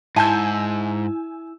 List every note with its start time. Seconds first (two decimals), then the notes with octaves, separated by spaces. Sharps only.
0.16 G#2 E4 G#5 A5 E6 G6